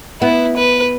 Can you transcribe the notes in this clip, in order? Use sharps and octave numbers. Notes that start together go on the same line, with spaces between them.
B3 E4
B4